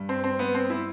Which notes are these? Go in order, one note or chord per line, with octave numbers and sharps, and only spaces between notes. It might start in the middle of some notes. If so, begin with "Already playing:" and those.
Already playing: G2
C4
C4
B3
C4
E4